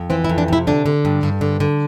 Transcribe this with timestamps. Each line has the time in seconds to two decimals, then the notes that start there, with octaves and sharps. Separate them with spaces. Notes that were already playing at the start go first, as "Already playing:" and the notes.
Already playing: F2
0.10 E3 C4
0.24 E4
0.29 F2
0.38 D4
0.48 C3 E4
0.67 D3 D4
0.86 D3
1.05 G2
1.23 G2
1.41 D3
1.60 D3